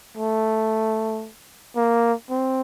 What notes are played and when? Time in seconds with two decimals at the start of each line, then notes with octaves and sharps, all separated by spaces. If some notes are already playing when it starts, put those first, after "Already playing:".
0.17 A3
1.76 A#3
2.30 C4